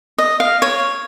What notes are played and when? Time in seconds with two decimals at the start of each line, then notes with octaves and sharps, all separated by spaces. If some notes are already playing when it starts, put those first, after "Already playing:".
0.18 D#5
0.40 F5
0.62 C#5